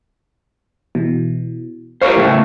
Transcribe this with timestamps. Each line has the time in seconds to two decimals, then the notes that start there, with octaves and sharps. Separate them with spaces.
0.95 B2 E3
2.01 G4 A#4 C5 F5 C#6
2.17 A2 C#3 A3